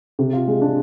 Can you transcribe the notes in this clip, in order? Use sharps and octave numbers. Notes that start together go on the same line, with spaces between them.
C3
F4
G#3
D4